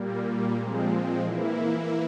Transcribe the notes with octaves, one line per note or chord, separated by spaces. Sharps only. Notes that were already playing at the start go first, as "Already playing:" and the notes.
Already playing: A#2 G3 A#3
A#2 F3 G#3 C4
E3 A#3 E4